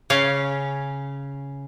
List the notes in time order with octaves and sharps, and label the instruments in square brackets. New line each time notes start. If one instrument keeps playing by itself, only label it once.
[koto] C#3 C#4 F5